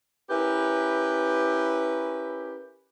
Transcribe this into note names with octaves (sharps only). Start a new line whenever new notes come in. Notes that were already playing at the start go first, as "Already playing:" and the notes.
C#4 E4 G4 A#4 B4